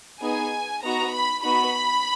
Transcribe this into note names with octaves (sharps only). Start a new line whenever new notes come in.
B3 D#4 G#4 G#5
B3 D#4 F#4 A#5
B5
B3 D#4 F#4 B5